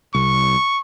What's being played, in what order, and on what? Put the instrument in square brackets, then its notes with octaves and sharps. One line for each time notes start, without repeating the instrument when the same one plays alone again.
[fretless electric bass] C2 [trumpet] C#6